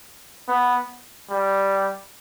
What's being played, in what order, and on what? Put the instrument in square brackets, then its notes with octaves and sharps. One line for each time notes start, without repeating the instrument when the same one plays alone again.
[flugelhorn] B3
G3